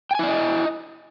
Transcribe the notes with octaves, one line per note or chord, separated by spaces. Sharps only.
E4 D5 D#5 G5 G#5